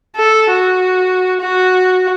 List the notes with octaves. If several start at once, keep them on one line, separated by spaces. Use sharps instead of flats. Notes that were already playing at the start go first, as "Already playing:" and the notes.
A4
F#4
F#4